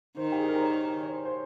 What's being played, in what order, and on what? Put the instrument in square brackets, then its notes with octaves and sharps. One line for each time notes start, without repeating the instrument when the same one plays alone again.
[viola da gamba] D#3 [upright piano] C5
[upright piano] G4
G#4
A#4
C5
C#5
C#5
C5
C5